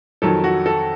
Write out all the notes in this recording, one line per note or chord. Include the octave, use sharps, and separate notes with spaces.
F2 D#3 F#3 A4
F#4
A4